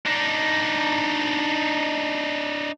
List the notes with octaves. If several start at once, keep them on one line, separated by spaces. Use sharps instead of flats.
D4 D#4